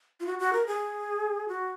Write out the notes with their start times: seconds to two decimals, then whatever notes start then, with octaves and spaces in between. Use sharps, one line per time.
0.20 F4
0.26 F#4
0.39 F#4
0.53 A#4
0.67 G#4
1.48 F#4